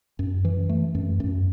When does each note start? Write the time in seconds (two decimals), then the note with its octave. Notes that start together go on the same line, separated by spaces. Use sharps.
0.19 F#2
0.45 E3
0.69 A3
0.95 F#2
1.20 F#2